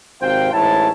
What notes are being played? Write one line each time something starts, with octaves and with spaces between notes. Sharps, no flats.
G#1 C3 C5 F5 G5
A1 G#2 E4 C#5 A5